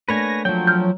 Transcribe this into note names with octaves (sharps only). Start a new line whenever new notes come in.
A3 A#3 D4 B4 C#5 G#5 A#6
F3 F#3 G5
F6 G6